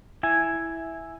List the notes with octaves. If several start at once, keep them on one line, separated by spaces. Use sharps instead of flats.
E4 G#5